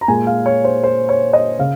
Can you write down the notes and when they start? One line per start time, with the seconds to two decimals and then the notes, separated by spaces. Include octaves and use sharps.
0.01 A#5
0.08 A#2 G#3 G#5
0.27 F5
0.46 C#5
0.64 C5
0.83 C5
1.09 C#5
1.33 D#5
1.59 C#3 F5